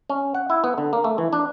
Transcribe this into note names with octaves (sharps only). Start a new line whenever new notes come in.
C#4
F#5
E4
B3
D3
A#3
A3
E3
D4